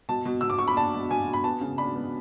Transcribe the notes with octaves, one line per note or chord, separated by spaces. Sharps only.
B2 A5
B2
B2 E6
D6
B2 C#6
B5
D4 A5
B2
B2 G#5
B2
B5
B3 A5
C#3
D4 B5
B3